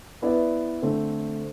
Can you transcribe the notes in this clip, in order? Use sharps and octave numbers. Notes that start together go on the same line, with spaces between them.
B3 E4 B4 D5
D3 A3 C4